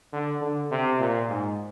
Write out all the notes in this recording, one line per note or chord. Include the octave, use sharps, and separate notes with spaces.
D3
D3
C3
A#2
G#2